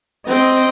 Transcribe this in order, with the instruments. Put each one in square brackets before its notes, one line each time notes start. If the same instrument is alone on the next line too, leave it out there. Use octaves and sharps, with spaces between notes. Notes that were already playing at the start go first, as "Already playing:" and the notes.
[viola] C4 [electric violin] D#5